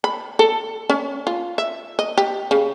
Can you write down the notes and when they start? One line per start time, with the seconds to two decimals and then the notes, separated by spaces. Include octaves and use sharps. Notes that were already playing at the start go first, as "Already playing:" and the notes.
0.04 B5
0.39 A4
0.90 C#4
1.27 F4
1.58 E5
1.99 D#5
2.18 G4
2.51 C#3